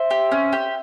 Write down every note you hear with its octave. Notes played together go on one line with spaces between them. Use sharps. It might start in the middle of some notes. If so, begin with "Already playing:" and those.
Already playing: C5 E5
G4
C#4
G4